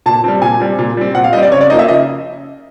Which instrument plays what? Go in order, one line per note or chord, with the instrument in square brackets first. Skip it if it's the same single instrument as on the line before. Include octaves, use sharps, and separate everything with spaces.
[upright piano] A#2 A5
G3 C4
A#2 G#5
G3 C4
A#2
G3 C4
A#2 F#5
F5
G3 C4 D#5
D5
C#3 C#5
D5
F3 A#3 D#4 D#5
E5
C#3 D#5